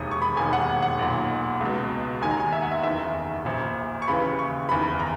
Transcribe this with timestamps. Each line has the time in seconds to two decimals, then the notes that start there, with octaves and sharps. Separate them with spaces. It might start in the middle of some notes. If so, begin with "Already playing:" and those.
Already playing: E1 D#2 D#3 D#6
0.11 C#6
0.22 B5
0.36 E1 D#2 D#3 G#5
0.53 F#5
0.82 F#5
0.99 B1 A#2
1.61 C#2 B2
2.21 D#2 D#3 G#5
2.31 A#5
2.40 G#5
2.52 E5
2.62 F#5
2.71 E5
2.83 F#1 E2 D#3 E5
3.45 A#1 A#2
4.02 C#6
4.08 D#2 C#3 E3 B5
4.39 C#6
4.68 F#1 E2 D#3 B5
4.99 A#5